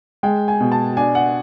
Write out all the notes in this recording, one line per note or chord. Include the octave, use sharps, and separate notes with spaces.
G#3 G5
G#5
B2
A5
D4 G#5
F#5